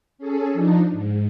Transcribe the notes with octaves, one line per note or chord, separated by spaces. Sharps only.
C#4 G#4 A4
F3 D4 D#4
G#2